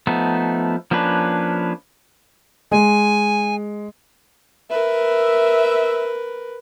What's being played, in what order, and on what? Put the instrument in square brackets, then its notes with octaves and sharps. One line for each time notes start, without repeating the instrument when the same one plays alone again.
[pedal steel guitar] F3 A3 B3 D#4
F3 A#3 C#4 D4 B4
[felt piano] G#3 [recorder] G#5
[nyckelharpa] A#4 B4 [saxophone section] E5